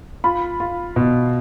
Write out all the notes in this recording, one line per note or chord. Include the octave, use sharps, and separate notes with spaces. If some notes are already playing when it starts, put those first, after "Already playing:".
F4 B5
F4
B2